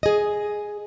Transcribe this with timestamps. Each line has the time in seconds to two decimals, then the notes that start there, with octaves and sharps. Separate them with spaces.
0.03 G#4 D#5